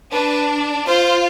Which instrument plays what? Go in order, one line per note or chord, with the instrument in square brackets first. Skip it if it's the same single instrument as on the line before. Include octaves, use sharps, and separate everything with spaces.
[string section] D4 [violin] B4
[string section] F4 [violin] C5